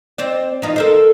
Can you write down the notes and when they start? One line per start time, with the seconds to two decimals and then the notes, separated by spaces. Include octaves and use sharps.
0.18 C4 C5 D5
0.62 E3 D#4 F4
0.76 A4 A#4 C5